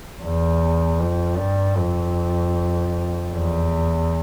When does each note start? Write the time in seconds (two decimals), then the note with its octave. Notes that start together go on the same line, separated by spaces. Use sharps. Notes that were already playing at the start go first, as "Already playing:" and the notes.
0.22 E2
0.99 F2
1.38 G2
1.77 F2
3.33 E2